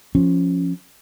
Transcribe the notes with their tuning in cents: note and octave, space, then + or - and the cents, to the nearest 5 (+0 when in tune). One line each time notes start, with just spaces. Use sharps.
F3 +0 C#4 +0